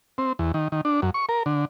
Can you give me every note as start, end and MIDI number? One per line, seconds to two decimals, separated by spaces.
0.18 0.33 60
0.39 0.52 40
0.54 0.68 51
0.72 0.81 51
0.85 1.01 62
1.02 1.10 42
1.14 1.26 85
1.29 1.43 70
1.46 1.65 50